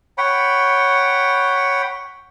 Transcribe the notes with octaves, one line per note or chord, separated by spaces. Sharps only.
C#5 F#5 G5 B5